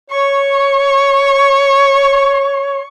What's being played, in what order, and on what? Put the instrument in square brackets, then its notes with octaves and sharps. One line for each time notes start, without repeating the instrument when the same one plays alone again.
[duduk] C#5 [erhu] C#6